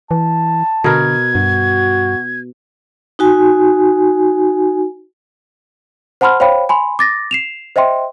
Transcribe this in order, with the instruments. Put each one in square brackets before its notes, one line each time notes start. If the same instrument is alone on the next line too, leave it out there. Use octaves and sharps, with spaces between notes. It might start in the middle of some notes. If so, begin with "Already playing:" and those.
[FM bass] E3 [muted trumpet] A5
[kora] B2 A#4 [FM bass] D3 [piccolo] G#6
[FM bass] G2 [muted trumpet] F#4
[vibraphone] D#4 F#4 G#5
[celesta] C5 F#5 A5 B5 C6 F6
C5 C#5 F5 G5 B5
G#5 B5 C6
D6 A6 A#6
C7 E7 F7
C5 D#5 E5 G5 C6